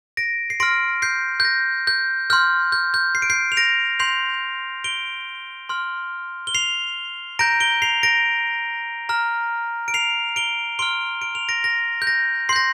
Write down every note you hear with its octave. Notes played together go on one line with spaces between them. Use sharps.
A#6 D7
C7
C6 F6 A#6 D7
G6 C7
G6
A#6
G6
C6 F6 G6
G6
G6
C7
D7
G6 C7
F7
A#6 D7
C6 G6 C7 F7
D7 G7
C6 F6
G7
C7 F7
A#5 G6 A#6 D7
D7 G7
C7 F7
A#6 D7
A#5 F6
D7
C7 F7
D7 G7
C6 F6 D7 G7
D7
F7
A#6 D7
A#6
G6
A#6
C6 G6 C7
A#6